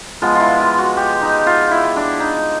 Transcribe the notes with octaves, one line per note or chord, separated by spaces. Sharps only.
F3 G#3 B3 F4
E4 F4
F4
F#4
G4
D#4
F4
E4
D4
D#4